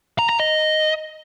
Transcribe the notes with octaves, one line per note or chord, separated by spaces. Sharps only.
A#5
A#5
D#5